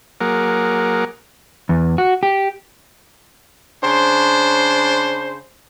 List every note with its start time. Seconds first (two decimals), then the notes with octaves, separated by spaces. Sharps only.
0.20 F#3 A#3 G#4 A#4 F#5 D6
1.69 E2
1.98 F#4
2.23 G4
3.84 C#3 D4 C5